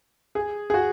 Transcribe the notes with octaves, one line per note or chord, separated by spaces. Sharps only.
G#4
G#4
F#4